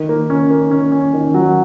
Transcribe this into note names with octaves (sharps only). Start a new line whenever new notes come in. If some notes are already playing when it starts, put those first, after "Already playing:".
Already playing: D#3
A#3
C#4
A#3
C#4
C#4
D#3
F#3